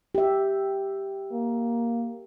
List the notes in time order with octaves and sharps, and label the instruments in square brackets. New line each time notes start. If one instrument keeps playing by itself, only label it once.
[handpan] G4 E5
[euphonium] A#3